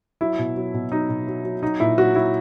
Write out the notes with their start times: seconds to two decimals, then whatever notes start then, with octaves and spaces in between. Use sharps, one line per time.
0.21 F#3 E4
0.39 B2
0.56 F#3
0.74 B2
0.92 F#3 D#4
1.09 B2
1.27 F#3
1.44 F#3
1.62 F#3 D#4
1.80 A#2 E4
1.97 F#3 F#4
2.15 F#3 E4